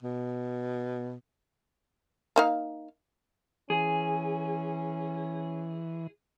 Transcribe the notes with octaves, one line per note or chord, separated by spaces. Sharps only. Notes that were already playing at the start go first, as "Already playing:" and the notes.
B2
A#3 D#4 F5
E3 C#4 G#4